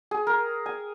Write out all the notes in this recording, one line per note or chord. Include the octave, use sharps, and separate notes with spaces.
G#4
A#4
G#5